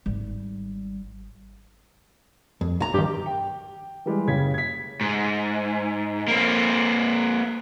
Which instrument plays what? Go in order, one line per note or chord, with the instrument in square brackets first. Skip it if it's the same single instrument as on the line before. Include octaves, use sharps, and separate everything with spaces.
[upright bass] G#1 G3
[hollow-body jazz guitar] F2
B1 A#5
[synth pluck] G2 D#3 [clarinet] G4
[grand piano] G5
E3 G3 G#3
F#1 C#3 G4 G#6 B6
G#6 B6
[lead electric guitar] G#2
A#3 C4